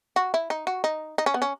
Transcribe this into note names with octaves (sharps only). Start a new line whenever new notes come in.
F#4
E4
D#4
F#4
D#4
D#4
C#4
B3
C#4